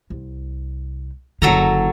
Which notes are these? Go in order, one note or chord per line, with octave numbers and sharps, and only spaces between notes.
C2
F#1 D3 F#3 A4 A#5